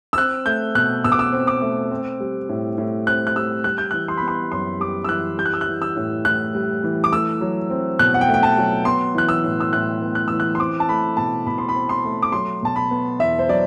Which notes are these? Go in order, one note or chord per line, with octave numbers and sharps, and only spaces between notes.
E6
C4 F#6
A3 G6
B2 F#6
B2 E6
D6
E6
C4
D6
A3
C4
G3
A2
A2
C4 F#6
F#6
G3 E6
G3 F#6
G6
E3 F#6
C6
B3 B5
C6
F#2 C6
G3 D6
E6
E3 F#6
G3 G6
F#6
E6
F#6
E3
E6
A2
A2 F#6
G3
E3
D6
A3 E6
F#3
C4
B2 F#6
F#5
G5
A3
G5
A5
F#3
B3 C6
E3 F#6
E6
A2
E6
A2 F#6
B3
F#6
E3 E6
F#6
C6
C4 D6
A5
A3 B5
B2 A5
B2 B5
C6
B5
C4
C6
A3
D6
F#3 C6
B2 A5
B5
B3
E2 E5
C5
F#3 D5